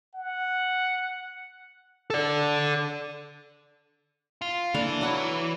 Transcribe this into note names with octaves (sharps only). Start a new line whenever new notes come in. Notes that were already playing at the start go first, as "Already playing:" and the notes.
F#5
A4 D5
F4
E3 A#3 D4 A4
F#3 F#5 C#6